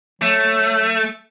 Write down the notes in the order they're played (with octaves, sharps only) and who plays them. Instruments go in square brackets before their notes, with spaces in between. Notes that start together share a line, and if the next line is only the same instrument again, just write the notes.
[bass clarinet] F#3 [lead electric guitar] A3